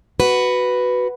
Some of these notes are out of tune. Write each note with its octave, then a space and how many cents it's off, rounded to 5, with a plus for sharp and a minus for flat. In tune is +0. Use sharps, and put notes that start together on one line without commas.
F#4 +5 B4 +0